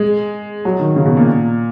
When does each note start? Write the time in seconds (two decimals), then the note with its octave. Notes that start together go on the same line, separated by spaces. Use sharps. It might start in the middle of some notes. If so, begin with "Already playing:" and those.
Already playing: G#3
0.65 F#3
0.80 D#3
0.96 C#3
1.06 B2
1.17 A#2